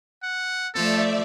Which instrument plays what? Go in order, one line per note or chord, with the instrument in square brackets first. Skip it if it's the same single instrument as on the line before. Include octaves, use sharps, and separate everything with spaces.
[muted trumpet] F#5
[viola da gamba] F3 A3 [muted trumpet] A4 [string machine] D5 E5